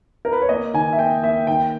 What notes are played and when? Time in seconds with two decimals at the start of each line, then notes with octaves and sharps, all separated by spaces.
0.25 A#4
0.33 B4
0.42 C#5
0.49 A#3 D#5
0.74 D#3 G#5
0.93 E5
0.98 A#3 G5
1.23 A#3 E5
1.47 D#3 G5